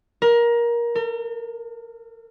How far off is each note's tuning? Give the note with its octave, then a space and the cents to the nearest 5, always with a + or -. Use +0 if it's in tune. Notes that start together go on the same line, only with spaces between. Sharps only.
A#4 +20
A#4 -45